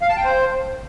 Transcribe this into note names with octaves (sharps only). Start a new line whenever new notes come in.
F5
A5
G5
C5